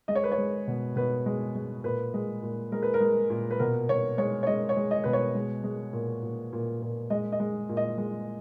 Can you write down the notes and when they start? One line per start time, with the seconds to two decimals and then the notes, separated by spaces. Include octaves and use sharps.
0.08 G#3 D#5
0.15 C#5
0.24 B4
0.32 C#5
0.38 G#3
0.68 B2
0.96 B2 B4
1.26 G#3
1.55 G#3
1.84 A#2 B4
2.14 G#3
2.42 A#2
2.72 G#3 A#4
2.82 B4
2.94 A#4
3.00 G#3
3.30 A#2
3.51 B4
3.59 B2 A#4
3.89 B2 C#5
4.18 G#3 C#5
4.43 C#5
4.47 G#3 D#5
4.69 C#5
4.77 G#3
4.91 D#5
5.04 B2 B4
5.13 C#5
5.35 G#3
5.64 G#3
5.93 A#2
6.23 A#2
6.53 A#2
6.82 A#2
7.10 G#3 D#5
7.32 D#5
7.40 G#3
7.69 A#2
7.77 D#5
7.98 G#3